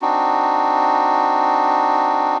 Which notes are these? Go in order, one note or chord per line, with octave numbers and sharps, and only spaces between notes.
C4 D4 D#4 F#4